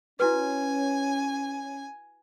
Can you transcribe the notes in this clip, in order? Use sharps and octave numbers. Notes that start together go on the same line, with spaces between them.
C#4 E4 F#4 B4 G#5